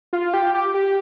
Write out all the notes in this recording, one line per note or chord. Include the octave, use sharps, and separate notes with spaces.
F4
G4
G4
G4